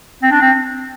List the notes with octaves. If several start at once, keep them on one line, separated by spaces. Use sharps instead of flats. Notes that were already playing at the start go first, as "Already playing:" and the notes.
C4
D4
C4